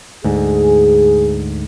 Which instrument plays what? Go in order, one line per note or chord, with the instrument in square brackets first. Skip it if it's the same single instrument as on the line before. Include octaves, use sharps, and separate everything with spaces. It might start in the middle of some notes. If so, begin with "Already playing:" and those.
[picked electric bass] D2 G#2 [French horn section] G#4